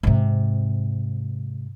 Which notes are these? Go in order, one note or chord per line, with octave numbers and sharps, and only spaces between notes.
G#2 C3